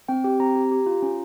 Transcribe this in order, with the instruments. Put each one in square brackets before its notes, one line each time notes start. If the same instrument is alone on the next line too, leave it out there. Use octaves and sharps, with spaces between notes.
[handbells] C4 G5
G4 G5
C4 A#5
G4
G4
F4
C#4